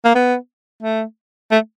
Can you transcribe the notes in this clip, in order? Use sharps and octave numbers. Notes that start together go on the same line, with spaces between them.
A#3
B3
A3
A3